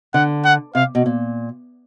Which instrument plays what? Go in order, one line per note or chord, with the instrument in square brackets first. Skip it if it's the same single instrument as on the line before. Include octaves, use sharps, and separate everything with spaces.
[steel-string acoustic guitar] D3 [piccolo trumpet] F#5
[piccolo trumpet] F#5
[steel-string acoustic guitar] C3 [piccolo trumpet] F5
[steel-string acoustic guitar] B2
A#2